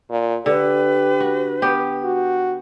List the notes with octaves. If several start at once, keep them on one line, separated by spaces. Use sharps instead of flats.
A#2
D3 G4 B4
F#4
B3 G4
F#4